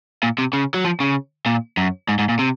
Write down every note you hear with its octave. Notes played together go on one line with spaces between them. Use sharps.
A#2
C3
C#3
F#3
F3
C#3
A#2
F#2
G#2
G#2
A#2
C3